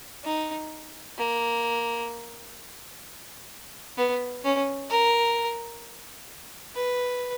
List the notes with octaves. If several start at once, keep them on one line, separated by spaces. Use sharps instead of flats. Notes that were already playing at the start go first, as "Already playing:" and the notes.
D#4
A#3
B3
C#4
A#4
B4